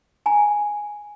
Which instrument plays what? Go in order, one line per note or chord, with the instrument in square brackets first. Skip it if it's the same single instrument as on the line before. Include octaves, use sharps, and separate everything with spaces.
[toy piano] G#5 A#5